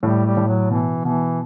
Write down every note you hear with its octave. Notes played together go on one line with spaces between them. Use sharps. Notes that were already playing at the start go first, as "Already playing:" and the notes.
A2 G3
G3
A2
F#3
B2 E3
B2 E3